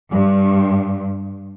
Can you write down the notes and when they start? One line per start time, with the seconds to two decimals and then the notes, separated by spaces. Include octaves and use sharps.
0.11 G2